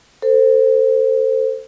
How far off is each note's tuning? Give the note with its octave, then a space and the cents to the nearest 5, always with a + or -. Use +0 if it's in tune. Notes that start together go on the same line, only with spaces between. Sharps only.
A4 +30 C5 +0